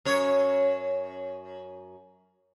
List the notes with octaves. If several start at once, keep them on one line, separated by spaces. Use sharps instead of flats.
F#2 C#5